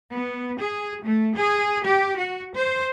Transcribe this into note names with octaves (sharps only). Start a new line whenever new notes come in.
B3
G#4
A3
G#4
G4
F#4
C5